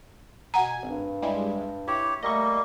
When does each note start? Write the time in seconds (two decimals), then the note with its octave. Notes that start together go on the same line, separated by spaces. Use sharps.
0.54 B2 F#5 G#5 A#5 G#6
0.83 G#1 G2
1.22 G3 G#3 E4
1.88 E4 G4 C#5
2.23 G3 A3 A#3 D#5 C#6